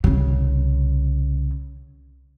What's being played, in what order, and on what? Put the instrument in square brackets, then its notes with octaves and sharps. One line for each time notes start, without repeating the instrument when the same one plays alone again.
[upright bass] C2 C#3